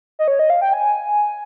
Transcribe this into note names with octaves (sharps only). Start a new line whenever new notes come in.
D#5
C#5
D#5
F5
G5
G#5